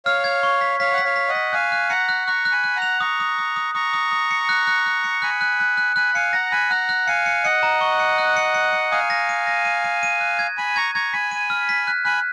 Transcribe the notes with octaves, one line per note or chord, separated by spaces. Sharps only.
C#5 F5 F6
G#6
C#6
B6
C#5 F5 B6
F#5 B6
C#5 F5
B6
D#5 F#5
B6
F5 G#5 F#6
F#6
F#5 A#5 C#7
F#6
A#5 C#6 F#6
F#6
G#5 B5
F#6
F#5 A#5
F7
A#5 C#6 D#6
D#6
D#6
D#6
A#5 C#6 D#6
D#6
D#6
C#7
F#6
F#6
F#6
C#7
G#5 B5 F#6
F#6
F#6
F#6
G#5 B5 F#6
F5 G#5 C#7
F#5 A#5 A#6
G#5 B5 F#6
F#5 A#5 F#6
F#6
F5 G#5 C#7
C#7
D#5 F#5 C#7
A#5
C#6
C#7
F#6
C#7
C#7
C#7
F5 G#5 D#6
A#6
D#7
A#6
D#7
D#7
D#7
F#6
G#6
G#5 B5 D#7
A#5 C#6 G#6
A#5 C#6 G#6
G#5 B5 B6
D#7
F6
B6
F#6
G#5 B5 F#6